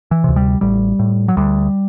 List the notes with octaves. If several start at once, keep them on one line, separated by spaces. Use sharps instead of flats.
E3
D2 C3
G3
A1 G3
A2
F#3
D2 G3